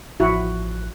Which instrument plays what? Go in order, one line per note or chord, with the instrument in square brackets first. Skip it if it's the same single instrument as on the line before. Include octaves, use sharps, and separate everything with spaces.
[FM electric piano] A1 F3 F#6 [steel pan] E4 F#4